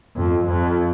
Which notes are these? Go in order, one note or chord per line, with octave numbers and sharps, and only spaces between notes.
F2
F2